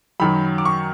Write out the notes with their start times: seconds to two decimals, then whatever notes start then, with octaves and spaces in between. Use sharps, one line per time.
0.20 F#2 D#3 F#3 B5
0.58 D6
0.65 C#6